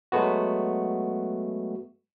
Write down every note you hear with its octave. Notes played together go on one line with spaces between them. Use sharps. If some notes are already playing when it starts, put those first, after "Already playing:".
F#3 G#3 A3 B3 F#4